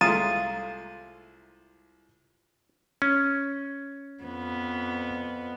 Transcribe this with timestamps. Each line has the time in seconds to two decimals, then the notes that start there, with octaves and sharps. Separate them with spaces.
0.01 C2 G#3 A3 F4 A#5 D#6 A6 D#7
3.02 C#4
4.24 F2 B3